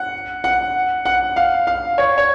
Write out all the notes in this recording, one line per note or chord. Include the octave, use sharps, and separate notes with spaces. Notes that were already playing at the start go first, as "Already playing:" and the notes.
Already playing: F#5
F#5
F#5
F5
F5
C#5
C#5